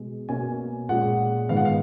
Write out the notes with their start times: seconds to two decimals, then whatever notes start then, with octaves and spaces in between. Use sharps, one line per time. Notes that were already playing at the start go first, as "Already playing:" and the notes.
Already playing: B2 G#3
0.29 B2 A#3 C#4 G#5
0.89 A#2 G#3 C#4 F#5
1.49 G#2 D#3 G#3 B3 F5
1.57 F#5
1.65 F5